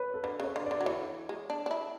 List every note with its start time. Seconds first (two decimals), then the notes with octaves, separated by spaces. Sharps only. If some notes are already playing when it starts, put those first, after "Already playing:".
Already playing: B4 C#5
0.14 A4
0.23 D3 B4
0.40 C#3 C#5
0.56 D3
0.66 D3 D5
0.81 F#3
0.86 E3 C#5
1.29 G#3
1.50 D4
1.66 D4
1.71 E4